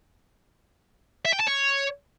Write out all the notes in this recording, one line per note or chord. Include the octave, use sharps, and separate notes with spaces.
E5
G5
A5
C#5